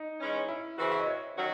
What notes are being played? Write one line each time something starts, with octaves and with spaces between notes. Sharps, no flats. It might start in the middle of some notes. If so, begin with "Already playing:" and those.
Already playing: D#4
E3 G#3 C#4
E4
C#3 E3 C4 F#4
E5
D#5
C#5
D#3 F#3 C#4 F#4